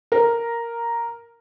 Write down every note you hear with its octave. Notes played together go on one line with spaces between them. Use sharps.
A#4